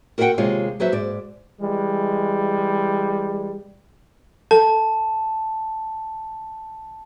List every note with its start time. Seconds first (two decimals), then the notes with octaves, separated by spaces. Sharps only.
0.18 F#4 A#4 D#5 E5 F#5 G5
0.38 D#2 C3 G#3 F4 C#5 F5
0.80 F#3 F#4 B4 C5 E5
0.92 G#2 D5
1.61 E3 G3 G#3
4.51 A4 A5